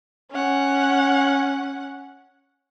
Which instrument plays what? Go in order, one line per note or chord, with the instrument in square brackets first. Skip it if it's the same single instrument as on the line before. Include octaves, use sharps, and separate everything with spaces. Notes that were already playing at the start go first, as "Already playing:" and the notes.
[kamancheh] C#4 F#5